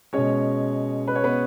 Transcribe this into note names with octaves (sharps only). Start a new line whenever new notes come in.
B2 G#3 C#4 C#5
B4
C#5
B3 B4